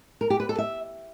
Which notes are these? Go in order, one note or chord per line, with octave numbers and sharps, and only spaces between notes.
A#4
G4
B4
A4
E5